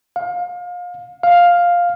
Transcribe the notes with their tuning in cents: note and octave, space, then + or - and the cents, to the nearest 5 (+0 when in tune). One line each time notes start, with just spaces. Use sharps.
F5 +30
F5 +5